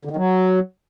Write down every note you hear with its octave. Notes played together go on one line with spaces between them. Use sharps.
D3
D#3
F#3